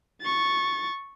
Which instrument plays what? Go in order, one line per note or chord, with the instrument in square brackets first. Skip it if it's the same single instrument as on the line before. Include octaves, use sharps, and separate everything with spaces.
[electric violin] C#6 A6